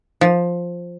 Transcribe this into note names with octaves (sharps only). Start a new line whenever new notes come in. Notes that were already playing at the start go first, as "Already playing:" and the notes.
F3